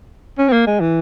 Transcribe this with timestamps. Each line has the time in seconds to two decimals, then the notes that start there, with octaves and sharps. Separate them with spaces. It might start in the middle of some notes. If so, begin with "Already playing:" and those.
0.38 C#4
0.48 C4
0.53 A#3
0.67 G#3
0.80 E3